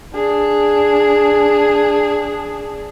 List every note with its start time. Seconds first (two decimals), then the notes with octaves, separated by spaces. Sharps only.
0.14 D4 G#4